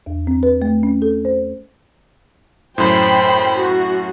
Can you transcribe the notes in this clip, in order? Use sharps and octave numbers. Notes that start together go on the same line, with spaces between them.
E2
C4
B4
A3
C#4
A4
C5
F#2 A2 C5 G5 B5
F#4